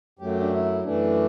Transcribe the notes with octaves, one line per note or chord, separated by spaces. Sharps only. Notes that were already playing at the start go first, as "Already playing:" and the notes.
F#2 F#3 A3 G4
D4
E4
F#2 E3 A3 D4